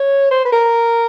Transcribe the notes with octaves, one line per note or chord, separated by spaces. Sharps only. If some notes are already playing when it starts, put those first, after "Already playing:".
Already playing: C#5
C5
B4
A#4